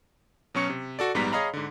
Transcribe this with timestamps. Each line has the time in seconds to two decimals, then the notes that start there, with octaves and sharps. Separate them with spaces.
0.55 B2 F#3 C#4 C#6 C#7
0.70 C3
0.99 F#4 A4 D5
1.14 A#1 G#2 G3 B3 A#5 B6
1.32 G#4 C#5 D#5 F5 A#5 B5
1.53 G#2 D3